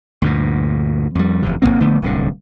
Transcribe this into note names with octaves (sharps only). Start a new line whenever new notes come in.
D2 G2 A#2
F2 G3
F1 E2 C3
E1 G#2 A#3 C4
A#1 D3 A3 B3
D1 C2 D3